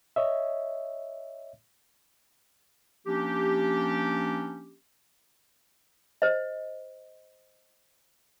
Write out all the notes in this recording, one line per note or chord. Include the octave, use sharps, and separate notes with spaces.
C#5 D#5 E5
F3 A#3 C#4 D4 G4
C5 D#5